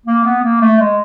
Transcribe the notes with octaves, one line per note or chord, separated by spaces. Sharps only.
A#3
B3
A#3
A3
G#3